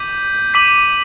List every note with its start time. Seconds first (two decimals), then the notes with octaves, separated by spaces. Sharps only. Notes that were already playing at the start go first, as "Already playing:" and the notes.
Already playing: D6 G6 B6 D#7 F#7
0.54 D6 G6 B6 D#7 F#7